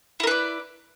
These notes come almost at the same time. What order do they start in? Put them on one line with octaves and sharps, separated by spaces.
E4 A#4 B4 D5